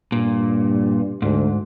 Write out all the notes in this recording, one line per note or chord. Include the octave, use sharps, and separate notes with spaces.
G2 A#2
D2 G#2